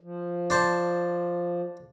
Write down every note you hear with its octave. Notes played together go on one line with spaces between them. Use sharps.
F3
D4 C5 A5